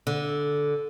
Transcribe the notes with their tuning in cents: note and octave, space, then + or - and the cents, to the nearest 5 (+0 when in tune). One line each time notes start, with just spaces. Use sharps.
D3 -10